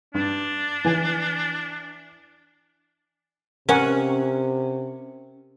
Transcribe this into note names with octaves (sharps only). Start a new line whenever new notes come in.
G2 D4
E3 G#5
C3 C#4 A#4 F#5 G#5